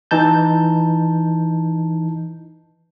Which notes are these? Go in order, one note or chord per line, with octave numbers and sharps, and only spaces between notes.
E3 D#4 A5 G6